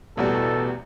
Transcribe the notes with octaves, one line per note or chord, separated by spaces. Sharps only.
A1 E2 B2 G3 A4